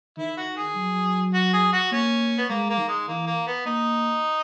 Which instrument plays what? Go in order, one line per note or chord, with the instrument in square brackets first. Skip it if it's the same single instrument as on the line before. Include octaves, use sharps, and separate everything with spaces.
[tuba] D#3 [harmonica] E4
[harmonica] F#4
G#4
[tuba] F#3
[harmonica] F#4
G#4
F#4
[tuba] A#3 [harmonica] C#4
[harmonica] B3
[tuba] G#3 [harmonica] A#3
[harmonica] A#3
[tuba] D#3
[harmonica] G#3
[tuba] E3 [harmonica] A#3
[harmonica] A#3
B3
[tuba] A#3 [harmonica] D#4